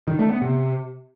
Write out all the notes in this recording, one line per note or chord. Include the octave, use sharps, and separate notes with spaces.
D#3
A3
B3
C3